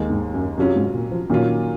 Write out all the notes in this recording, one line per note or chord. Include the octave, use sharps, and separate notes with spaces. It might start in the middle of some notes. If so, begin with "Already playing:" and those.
Already playing: D#2 D#3 G#3
G#2
F#2
F#2 C3 F#3 C#4 F4
G#2
A#2
F3
A#2 D#3 F#3 C#4 F4